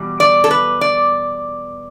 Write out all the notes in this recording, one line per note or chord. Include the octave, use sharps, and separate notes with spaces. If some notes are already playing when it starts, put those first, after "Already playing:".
Already playing: E2 B2 G3
D5
A4
B4
D5